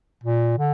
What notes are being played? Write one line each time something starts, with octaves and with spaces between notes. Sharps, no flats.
A#2
D3